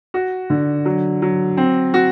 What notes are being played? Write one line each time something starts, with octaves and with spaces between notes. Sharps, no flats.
F#4
D3
F#3
F#3
C4
F#4